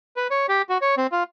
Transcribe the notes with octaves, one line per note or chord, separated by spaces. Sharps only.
B4
C#5
G4
F#4
C#5
C4
F4